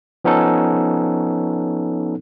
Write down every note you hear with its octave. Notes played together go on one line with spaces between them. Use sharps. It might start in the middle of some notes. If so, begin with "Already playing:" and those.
F3 B3 C#4 D#4 A4